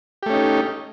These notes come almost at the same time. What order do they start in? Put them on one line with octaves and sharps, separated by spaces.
G4 A3 C#4 D#4